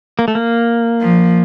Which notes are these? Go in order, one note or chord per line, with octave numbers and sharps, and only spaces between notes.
A#3
A3
A#3
F3